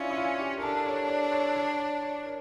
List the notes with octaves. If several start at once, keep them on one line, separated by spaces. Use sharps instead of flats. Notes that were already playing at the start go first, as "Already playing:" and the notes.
Already playing: C#4 D4 E4 F4
E4
F4
G4
A#4
D4 A4
C#5
D5
C#5
C#5
D5
C#5
A#4